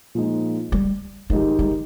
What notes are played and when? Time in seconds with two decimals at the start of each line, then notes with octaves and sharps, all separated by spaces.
0.15 A#2 F3 G#3 D#4
0.72 G3
1.30 G#2 D#3 F3 G#3 D#4 G4
1.59 G3